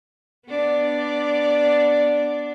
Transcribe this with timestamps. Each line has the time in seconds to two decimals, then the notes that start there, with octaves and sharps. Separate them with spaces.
0.47 B3 D4 D5